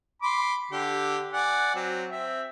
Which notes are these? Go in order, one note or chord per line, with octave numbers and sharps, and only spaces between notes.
B5 C6 D6
D3 G4
D5 F#5 G#5
F#3 C4
C4 E5